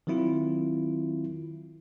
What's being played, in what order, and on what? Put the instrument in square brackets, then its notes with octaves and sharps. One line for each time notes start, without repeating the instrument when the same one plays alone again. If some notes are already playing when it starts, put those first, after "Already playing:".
[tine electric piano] D#3 F#3 C4 E4 F4